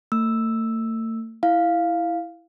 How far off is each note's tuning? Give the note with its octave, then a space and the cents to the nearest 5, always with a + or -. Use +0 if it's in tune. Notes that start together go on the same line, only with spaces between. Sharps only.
A3 +45 E6 +0
E4 +0 F5 +0